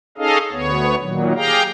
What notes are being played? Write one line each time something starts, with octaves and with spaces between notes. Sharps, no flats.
C#4 D#4 G#4 A4 D#5 F5
D2 B3 C#5
A#2 D#3 F#3
G4 G#4 F5 G5 A#5